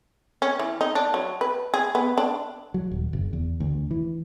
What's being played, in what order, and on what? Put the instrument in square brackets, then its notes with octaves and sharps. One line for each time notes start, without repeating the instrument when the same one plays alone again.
[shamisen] C#4
E3
D#4
D4
F#3
B4
G#4
B3
D4
[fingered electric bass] F#3
D#1
F#1
E2
D2
E3